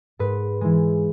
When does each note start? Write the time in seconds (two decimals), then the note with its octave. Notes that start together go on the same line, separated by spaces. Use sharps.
0.19 G#2 B4
0.61 E3 G#3